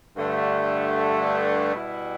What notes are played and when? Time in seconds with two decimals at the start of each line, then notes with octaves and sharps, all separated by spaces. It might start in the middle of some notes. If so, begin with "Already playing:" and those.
0.16 G2 D3 A3
1.73 B2 G3 E4